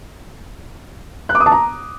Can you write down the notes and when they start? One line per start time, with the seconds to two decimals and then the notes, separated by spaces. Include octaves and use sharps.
1.29 F#6
1.35 D6
1.40 D#6
1.46 A5
1.52 A#5